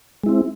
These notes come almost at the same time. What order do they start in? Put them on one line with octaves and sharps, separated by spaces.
G#3 E4 C4